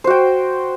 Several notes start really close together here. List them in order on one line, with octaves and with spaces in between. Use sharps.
C5 F#4 G5